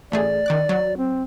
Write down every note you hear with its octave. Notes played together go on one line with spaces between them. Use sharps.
A1 A3 G#4 D5
D#3 D6 F#6
F#3
C4